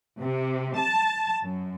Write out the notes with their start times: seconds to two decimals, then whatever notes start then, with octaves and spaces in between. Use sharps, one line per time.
0.20 C3
0.77 A5
1.43 F#2